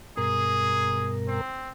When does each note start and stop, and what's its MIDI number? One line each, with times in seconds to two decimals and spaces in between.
0.17 1.41 43
0.17 1.41 47
0.17 1.15 68
0.17 1.41 70
1.28 1.71 60